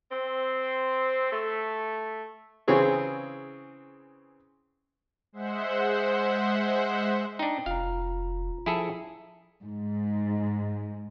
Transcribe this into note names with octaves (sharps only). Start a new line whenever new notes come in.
C4
A3
C#3 E3 C4 G#4 C#5
G#3 C5 E5 F#5
D4 D#4 G5
F1 F4 F5 A#5
F3 E4 G#4 A4
G#2